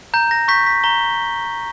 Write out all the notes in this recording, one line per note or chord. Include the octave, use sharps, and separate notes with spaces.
A#5 G6
A#6
C#6 G6 B6
B6
A#5 G7